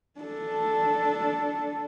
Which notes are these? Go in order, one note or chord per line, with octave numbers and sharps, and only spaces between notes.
D4 A4